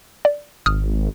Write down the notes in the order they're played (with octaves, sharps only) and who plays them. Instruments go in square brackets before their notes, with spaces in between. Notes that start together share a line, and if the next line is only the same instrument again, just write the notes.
[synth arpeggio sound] D5
[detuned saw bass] G#1 [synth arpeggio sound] D#6 F6